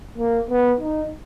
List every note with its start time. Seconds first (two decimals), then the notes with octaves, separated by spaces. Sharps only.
0.17 A#3
0.49 B3
0.80 D#4